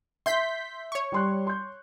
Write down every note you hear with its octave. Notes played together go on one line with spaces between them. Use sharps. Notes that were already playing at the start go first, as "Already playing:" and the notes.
E5 C6 G6 B6
C#5 C#6
G3 C6 F#6
C6 G6